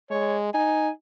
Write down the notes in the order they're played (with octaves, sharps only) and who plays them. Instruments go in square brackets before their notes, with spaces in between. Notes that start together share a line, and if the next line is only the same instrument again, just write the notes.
[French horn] G#3 [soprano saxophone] C#5
[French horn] D#4 [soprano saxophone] G#5